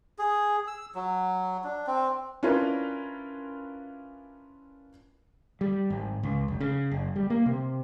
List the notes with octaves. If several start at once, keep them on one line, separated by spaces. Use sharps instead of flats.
G#4
E6
F#3
D4
C4
C#4 D4 E4 F4 A#4 B4
G3
G#1
C#2
F1
C#3
F#1
G3
A#3
C3